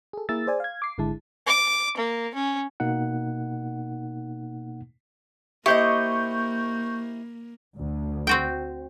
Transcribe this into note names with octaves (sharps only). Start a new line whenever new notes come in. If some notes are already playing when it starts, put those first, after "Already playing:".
G#4 A4
A#3 E4 G#4 A#4 E6 A6
G#4 C5 D5 G#5
F5 G#6
D6 C7
G#1 D3 G#3 E4 A5
D6
A#3
C#4
B2 A#3 D#4 F#5
A#3 E4 G4 C5 D#5 C#6 G6
D2
C4 F#4 G5